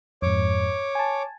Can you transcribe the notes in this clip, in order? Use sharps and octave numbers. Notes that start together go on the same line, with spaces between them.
F2 G#2 C#5 D6
G#5 A5